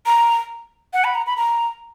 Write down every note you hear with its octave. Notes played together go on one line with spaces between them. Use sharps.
A#5
F#5
B5
A#5
B5
A#5